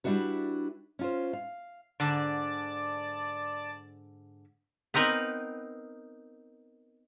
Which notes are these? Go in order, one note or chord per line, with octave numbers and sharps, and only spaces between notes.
G3 D4 E4 F#4 B4
C#4 F4 C5
F5
G#2 D3 D5 A5
B3 C4 D#4 A#4 B4